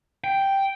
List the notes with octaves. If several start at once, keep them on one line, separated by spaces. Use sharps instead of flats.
G5